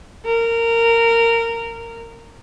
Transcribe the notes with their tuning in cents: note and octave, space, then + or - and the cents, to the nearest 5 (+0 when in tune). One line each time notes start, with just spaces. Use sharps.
A#4 -15